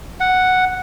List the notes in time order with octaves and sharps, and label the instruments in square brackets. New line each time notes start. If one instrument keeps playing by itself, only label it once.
[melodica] F#5